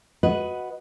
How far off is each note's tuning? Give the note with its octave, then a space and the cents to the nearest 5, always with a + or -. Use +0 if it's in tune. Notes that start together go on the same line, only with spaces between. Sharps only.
F#4 +0 B4 +0 D#5 +15